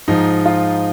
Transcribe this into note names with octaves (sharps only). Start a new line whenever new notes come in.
G#2 F3 D#4
F4